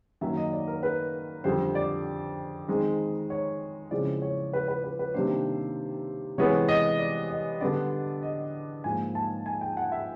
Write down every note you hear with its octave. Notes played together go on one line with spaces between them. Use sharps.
F#2 D#3 F#3 A#3 E5
D#5
D5
A#4
B4
F2 D3 G3 C5
D5
D#3 G#3 C4 D#4
C#5
C#3 F3 G#3 C4 E4 D5
C#5
B4
B4
B4
B4
C3 D#3 G3 A#3 D4 C5
C3 E3 G#3 B3 C#5
D#5
D5
D#5
D3 G3 B3 D4 D5
D#5
G#2 F3 A#3 G#5
A5
G#5
G5
F#5
E5